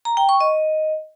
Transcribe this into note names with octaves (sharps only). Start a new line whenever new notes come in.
A#5
G5
C#6
D#5